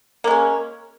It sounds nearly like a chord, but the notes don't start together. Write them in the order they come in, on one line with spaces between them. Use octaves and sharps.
A#3 G#3 C#4